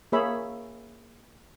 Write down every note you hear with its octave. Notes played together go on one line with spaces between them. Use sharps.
A#3 G#4 C#5 E5 B5